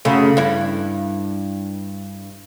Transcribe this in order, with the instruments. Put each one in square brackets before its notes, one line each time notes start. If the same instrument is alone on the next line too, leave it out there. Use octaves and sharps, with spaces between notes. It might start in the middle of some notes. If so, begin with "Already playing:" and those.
[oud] F#2 C#3 A3
G2 E4